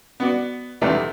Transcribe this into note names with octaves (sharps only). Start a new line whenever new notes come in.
B3 F#4 D5
B1 E2 C3 D#3 A3 B4